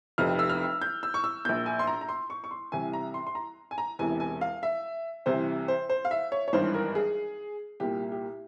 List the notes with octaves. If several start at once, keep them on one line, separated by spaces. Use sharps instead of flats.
F1 F2 C3 F6
E6
F6
G6
E6
C#6
E6
A#1 A#2 G6
G#5
C6
A#5
A#5
C6
C#6
C#6
C6
C2 C3 E3 G#5
A#5
C6
C6
A#5
G#5
A#5
E1 E2 C3 E3 G#5
G#5
F5
E5
C2 C3 E3 C5
C5
C5
F5
E5
C#5
C#5
G#1 G2 E3 C5
A#4
G#4
C2 A#2 G4
G4